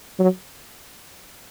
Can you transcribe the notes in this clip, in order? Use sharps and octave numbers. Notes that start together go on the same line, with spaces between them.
F#3